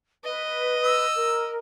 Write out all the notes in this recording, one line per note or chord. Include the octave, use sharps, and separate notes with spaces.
B4 D#5
E6
A#4